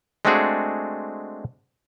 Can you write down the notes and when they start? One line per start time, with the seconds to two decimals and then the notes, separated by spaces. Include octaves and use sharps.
0.25 G#3 A3 C4 D4 F#4 G#4